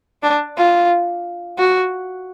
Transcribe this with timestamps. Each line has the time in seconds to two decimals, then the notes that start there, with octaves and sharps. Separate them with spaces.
0.23 D4
0.57 F4
1.58 F#4